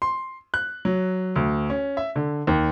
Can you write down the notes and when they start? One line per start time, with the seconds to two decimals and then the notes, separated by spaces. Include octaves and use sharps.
0.02 C6
0.54 F#6
0.85 F#3
1.36 D2
1.70 C#4
1.97 E5
2.16 D3
2.47 D#2